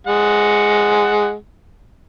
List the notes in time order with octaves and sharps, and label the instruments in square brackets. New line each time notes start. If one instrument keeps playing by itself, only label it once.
[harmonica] G#3 F#5